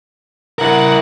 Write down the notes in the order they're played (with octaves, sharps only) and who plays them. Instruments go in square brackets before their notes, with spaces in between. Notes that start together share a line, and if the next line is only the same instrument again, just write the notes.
[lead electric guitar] E4 A#4 [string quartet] F#5